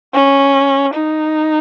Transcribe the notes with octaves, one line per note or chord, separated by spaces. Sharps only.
C#4
D#4